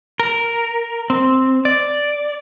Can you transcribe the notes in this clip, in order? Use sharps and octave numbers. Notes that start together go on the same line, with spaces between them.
A#4
C4
D5